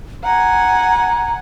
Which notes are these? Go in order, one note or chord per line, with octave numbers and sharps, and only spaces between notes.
F#5 G#5 A#5